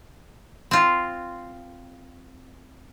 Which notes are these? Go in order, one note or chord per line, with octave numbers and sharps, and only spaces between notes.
C4 F4